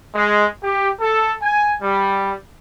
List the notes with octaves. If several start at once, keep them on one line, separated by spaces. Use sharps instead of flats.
G#3
G4
A4
G#5
G3